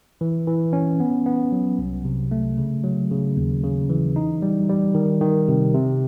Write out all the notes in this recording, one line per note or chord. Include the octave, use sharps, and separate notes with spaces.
E3
E3
C#4
B3
B3
F#3
C2
C3
A3
C#3
F#3
C#3
D#2
C#3
E3
D#4
G3
G3
D#3
D#3
C3
C3